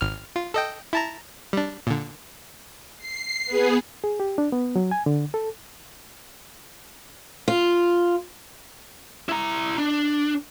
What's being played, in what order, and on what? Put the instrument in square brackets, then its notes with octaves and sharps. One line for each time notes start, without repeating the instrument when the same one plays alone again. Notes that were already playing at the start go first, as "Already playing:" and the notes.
[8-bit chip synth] G#1 F6
F4
A4 D#5 G5
E4 A5 A#5
G3 D4
A#2 D3
[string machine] C7
B3 G#4
[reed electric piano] G#4
G4
D4
B3
F#3
G#5
D3
A4
[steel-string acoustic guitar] F4
[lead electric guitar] E4 A#5
D4